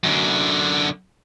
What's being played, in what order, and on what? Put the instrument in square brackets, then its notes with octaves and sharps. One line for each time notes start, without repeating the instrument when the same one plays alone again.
[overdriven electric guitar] F#2 D3